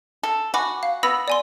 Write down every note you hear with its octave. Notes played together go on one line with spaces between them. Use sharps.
A4
F#4 G#5 B5 D6
F5
B3 B5 E6 A#6
D5 G#5 C6